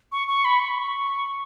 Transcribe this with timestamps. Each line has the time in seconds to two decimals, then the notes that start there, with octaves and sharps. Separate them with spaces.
0.12 C#6
0.28 C#6
0.45 B5
0.60 C#6
0.69 B5
0.78 C#6